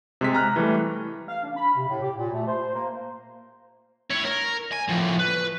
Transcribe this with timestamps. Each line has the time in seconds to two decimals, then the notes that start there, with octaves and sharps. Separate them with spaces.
0.21 C3 G#3 B6
0.34 A#5 F6 F#6
0.56 E3 G3 A3
1.28 F5
1.44 D4
1.57 B5
1.77 C3
1.89 A2
2.02 G4
2.17 A#2
2.33 A3
2.47 C5
2.75 A#3
4.10 E4 C#5
4.25 A#4
4.72 G#5
4.88 A2 F3
5.19 B4